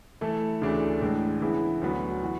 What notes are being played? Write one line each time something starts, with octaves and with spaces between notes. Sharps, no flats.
E3 A3 E4 A4
D2 C#3 E3 A3 D4
A2 E3 G#3 D4
C#3 E3 B3 E4
D2 D3 F#3 B3 F#4
E3 B3 F#4